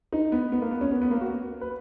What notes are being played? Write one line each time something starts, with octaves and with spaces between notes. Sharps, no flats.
D#4
B3
B3
A#3
B3
C#4
B3
B3
A#3
F#4
B4